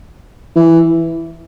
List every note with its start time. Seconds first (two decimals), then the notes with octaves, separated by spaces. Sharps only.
0.56 E3